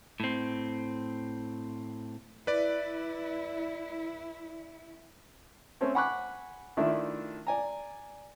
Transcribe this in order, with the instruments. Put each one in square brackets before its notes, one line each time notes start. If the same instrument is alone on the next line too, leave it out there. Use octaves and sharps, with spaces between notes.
[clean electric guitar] A2 C4
[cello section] E4 [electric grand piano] B4 D5
[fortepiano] A3 C4 C#4
F#5 G#5 B5 C#6 D6 F#6
D#3 A3 D4 E4 F4
D5 G#5 A#5